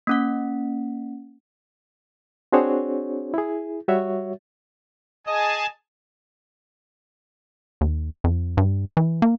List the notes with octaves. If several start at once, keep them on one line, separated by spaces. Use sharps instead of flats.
A#3 C#4 F#5
C4 D4 F#4 G#4 C5 C#5
E4 G#4
G3 F#4 C#5 E5
G#4 D#5 G#5 A5
D#2
F2
G2
E3
A#3